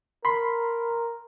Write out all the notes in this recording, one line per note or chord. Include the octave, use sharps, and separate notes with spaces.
A#4 B5 C6